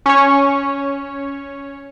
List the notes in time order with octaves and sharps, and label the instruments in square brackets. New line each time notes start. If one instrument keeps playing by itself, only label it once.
[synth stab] C#4 C#5